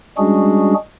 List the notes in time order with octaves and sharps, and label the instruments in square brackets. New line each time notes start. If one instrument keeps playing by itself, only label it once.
[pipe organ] G3 G#3 C#4 D4 F#4 G#4